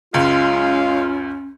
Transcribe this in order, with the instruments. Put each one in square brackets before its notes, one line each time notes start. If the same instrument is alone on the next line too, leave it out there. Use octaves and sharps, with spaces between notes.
[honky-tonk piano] C#2 F#2 [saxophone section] G#3 F5 [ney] C#4 [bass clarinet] F4